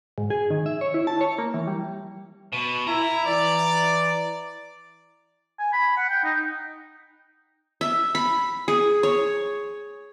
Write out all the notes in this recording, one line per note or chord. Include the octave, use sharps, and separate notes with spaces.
G#2
G#4
D#3
E5
C#5
E4
A5
C#5
A#3
E3
G3
B2
E4 A#5
E3 D5
G#5
B5
F#5
G5
D#4
E5
B5
G#4
C#5